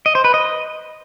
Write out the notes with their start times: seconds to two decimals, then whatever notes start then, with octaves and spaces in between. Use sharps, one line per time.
0.06 D#5
0.15 C5
0.24 B4
0.34 D#5